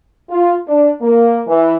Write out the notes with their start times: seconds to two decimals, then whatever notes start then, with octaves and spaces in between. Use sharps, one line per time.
0.30 F4
0.68 D4
1.02 A#3
1.48 E3